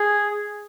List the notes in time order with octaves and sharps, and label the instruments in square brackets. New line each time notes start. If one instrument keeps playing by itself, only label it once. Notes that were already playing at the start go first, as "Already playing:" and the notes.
Already playing: [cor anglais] G#4